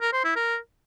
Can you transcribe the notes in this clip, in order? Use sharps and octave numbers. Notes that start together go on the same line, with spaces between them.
A#4
C5
E4
A#4